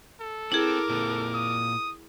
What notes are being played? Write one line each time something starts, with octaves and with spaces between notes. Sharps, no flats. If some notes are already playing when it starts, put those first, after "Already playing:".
A4
C4 E4 G#4 A#4 D6
A#2 C4 A4
D#6